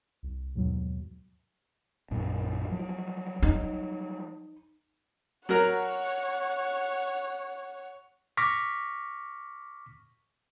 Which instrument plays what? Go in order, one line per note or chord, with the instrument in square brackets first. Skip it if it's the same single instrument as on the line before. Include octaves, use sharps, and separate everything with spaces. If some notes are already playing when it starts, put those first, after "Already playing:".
[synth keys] C2
D#2 G#2 B2 F#3
[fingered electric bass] A#1 F#2 A#2
F3 F#3
[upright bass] D#4
[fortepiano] F#3 A#4 [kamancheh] C#5 F#5
[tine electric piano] C#6 D6 F6 A#6 B6